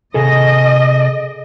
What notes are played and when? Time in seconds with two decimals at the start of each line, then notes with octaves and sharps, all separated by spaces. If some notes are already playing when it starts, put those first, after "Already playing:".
0.14 C3 G#4 A4 D#5